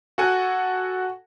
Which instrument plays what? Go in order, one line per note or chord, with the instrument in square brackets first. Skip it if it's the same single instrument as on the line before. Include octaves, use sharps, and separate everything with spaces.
[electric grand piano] F#4 A4 F#5 G#5